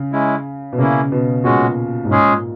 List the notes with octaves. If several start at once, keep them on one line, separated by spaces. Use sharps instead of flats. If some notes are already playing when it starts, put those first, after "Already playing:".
Already playing: C#3
G#3 C#4 E4
B2
C#3 A#3 C#4 E4
B2
A#2 G#3 C#4 F#4
G#2
A#2 G#3 C#4 G#4